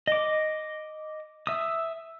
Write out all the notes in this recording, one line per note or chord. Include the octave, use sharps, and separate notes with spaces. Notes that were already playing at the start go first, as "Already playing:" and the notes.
D#5 D6
E5 D#6